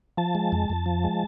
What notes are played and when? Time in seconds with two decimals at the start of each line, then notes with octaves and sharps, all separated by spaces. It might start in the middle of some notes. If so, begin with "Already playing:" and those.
0.17 F3 A5
0.35 G#3
0.52 F2
0.70 F2
0.86 F3
1.04 G#3